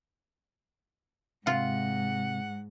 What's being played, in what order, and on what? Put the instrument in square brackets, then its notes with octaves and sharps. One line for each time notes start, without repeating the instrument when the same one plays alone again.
[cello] G#2 [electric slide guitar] C3 [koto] F4 [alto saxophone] F#5